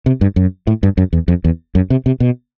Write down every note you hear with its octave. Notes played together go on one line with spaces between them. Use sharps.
C3
G2
F#2
A2
G2
F#2
E2
F2
E2
F#2
C3
C3
B2